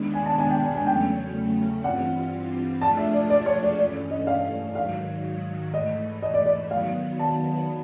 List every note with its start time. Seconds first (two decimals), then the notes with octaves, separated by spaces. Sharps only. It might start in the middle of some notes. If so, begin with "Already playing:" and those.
Already playing: D#2 D#3 G#3 B3 D4
0.14 G#5
0.26 A5
0.38 G#5
0.50 G5
0.62 G#5
0.75 G#5
0.87 E2 C#3 F#3 A3 C#4 G5
1.84 G2 E3 G3 C4 F4 F#5
2.81 F3 A3 D4 F4 G#4 A5
2.97 E5
3.13 D5
3.30 D5
3.46 C#5
3.63 D5
3.78 G2 E3 A3 C#4 D5
4.11 D#5
4.27 F5
4.75 G#2 D#3 F#3 F5
5.73 G#2 E3 A3 D#5
6.22 D#5
6.34 D5
6.46 D5
6.70 D#3 F#3 B3 F5
7.19 A5